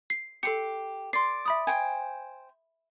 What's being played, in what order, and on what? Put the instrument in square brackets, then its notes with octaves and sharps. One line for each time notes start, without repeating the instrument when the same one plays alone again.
[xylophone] C7
[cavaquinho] G4 C6 [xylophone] A4 C#7
[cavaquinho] D5 [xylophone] C6 C7
[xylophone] E5 B5 D#6
[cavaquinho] C5 G5 G#5